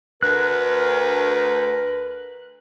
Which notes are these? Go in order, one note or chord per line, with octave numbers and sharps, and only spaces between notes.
D2 A#4 B4 F#6